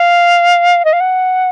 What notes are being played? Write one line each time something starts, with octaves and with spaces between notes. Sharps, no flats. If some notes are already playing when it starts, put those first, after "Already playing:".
Already playing: F5
D#5
F5
F#5